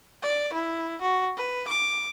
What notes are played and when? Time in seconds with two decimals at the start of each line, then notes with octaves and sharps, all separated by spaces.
0.22 D5
0.53 E4
1.02 F#4
1.37 B4
1.68 D6